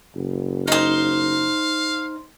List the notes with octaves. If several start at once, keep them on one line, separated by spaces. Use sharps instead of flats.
F#1
D#4 C5 F5